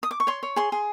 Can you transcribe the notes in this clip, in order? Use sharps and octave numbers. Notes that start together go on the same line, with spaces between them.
D#6
D6
C#6
C#5 C6
C#5
G#4 C6
G#4